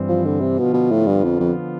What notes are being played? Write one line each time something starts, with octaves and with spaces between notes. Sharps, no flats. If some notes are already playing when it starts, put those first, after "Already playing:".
Already playing: G2 E3 G3 C4
F3
D3
C3
B2 D3 F3 B3 F4
B2
A2
G2
F2
F2